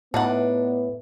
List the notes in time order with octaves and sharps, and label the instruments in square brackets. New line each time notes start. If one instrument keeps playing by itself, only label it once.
[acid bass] A2 [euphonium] B3 [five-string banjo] D4 D#4 F#5